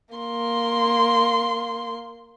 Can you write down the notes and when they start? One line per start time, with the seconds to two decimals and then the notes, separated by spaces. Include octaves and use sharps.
0.15 A#3 C6